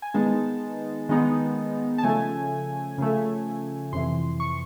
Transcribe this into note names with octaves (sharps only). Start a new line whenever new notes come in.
G#5
D#3 G#3 B3 D#4 A5
D#3 G#3 B3 D#4
A5
C#3 F3 A3 G#5
C#3 F3 A3
F2 C3 E3 C6
C#6